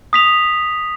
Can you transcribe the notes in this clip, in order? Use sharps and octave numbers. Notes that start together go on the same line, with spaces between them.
D#6 B6 F7